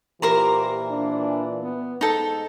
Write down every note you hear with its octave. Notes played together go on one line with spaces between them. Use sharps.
A#2 E3 G4 A#4 C5 A#5
D4
B3
G#2 D#4 A4